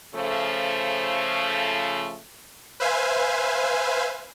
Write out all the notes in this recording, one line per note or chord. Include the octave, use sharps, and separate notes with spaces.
C#3 F3 A3
B4 C5 E5 F5 G#5